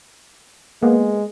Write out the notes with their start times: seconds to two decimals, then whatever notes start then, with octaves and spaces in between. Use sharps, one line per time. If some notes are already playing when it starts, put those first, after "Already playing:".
0.83 G#3 A#3 B3